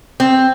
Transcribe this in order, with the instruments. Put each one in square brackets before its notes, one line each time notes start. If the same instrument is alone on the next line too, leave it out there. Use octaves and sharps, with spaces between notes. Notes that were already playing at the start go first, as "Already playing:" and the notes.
[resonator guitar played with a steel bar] C4